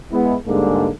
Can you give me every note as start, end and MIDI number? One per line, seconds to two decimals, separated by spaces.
0.12 0.35 56
0.12 0.35 59
0.12 0.35 64
0.48 0.88 44
0.48 0.88 50
0.48 0.88 55
0.48 0.88 56
0.48 0.88 58
0.48 0.88 62